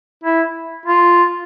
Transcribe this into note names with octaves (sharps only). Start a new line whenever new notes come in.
E4
F4